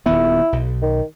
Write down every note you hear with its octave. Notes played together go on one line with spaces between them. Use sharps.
D#1 D#3 B3 E4
B1
D#3